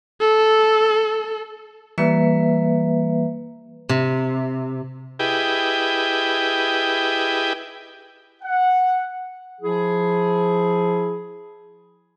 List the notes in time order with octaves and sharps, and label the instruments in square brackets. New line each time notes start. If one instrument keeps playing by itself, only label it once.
[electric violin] A4
[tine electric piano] E3 G3 [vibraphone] A#3 B4 E5
[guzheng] C3
[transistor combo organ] E4 G4 G#4 B4 D#5 G5
[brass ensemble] F#5
[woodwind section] F3 E4 G#4